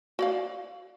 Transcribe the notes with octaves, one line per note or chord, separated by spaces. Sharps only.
F#4 D5 F5